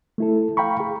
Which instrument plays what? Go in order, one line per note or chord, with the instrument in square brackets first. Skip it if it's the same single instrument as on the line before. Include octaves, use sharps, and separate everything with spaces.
[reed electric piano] A3 E4 A4
F5 G5 A#5 B5 C#6
G#4